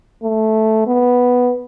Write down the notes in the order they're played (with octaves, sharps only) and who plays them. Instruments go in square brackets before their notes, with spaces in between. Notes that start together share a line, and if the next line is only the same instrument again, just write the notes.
[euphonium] A3
B3